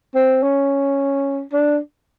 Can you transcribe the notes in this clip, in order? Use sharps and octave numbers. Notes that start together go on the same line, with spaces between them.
C4
C#4
D4